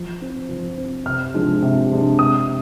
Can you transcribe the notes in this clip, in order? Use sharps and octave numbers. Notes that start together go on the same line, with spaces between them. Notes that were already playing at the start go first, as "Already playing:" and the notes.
Already playing: F3
C4
F3
C4
C3 F6
F3 G#3 D4
C3
F3 G#3 D4
C3 D#6